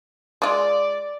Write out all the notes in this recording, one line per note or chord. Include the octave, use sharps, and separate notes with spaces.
G#3 F4 D5